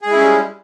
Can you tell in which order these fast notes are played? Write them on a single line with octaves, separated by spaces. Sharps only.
G#4 G#3 E4 C#4 G3